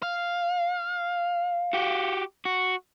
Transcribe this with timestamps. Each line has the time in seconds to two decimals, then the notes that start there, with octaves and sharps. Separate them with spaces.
0.03 F5
1.73 F#4 G4
2.45 F#4